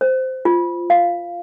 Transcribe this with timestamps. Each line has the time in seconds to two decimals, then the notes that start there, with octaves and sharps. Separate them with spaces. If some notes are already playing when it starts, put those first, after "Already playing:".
0.01 C5
0.45 F4
0.90 F5